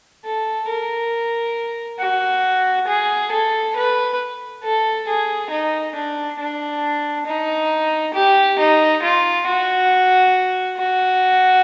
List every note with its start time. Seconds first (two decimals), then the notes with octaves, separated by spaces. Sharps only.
0.25 A4
0.69 A#4
1.99 F#4
2.87 G#4
3.31 A4
3.76 B4
4.64 A4
5.08 G#4
5.50 D#4
5.95 D4
6.39 D4
7.26 D#4
8.14 G4
8.59 D#4
9.02 F4
9.47 F#4
10.78 F#4